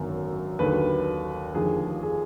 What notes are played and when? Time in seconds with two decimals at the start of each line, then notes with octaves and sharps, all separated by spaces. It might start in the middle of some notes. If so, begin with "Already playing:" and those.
Already playing: G#1 F#2 D3 F#3 B3
0.59 D#2 D3 F#3 B4
1.54 F1 D#2 D3 F3 G#4
2.03 G#4